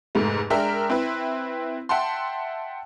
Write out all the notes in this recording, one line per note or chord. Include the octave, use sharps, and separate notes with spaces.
F1 G#2 A3
G#3 D4 A#4 E5 G5
C4 E4 B4
E5 F#5 G5 A5 C6